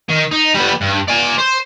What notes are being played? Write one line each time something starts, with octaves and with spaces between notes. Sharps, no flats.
D#3
D#4
G3 B3
G2
D5 G#5
C5